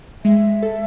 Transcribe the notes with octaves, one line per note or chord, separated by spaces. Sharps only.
G#3 E5
A4